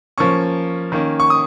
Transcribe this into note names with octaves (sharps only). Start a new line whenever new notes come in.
F3 A#3 C#4 C#6
D#3 A#3 C#4
C#6
D#6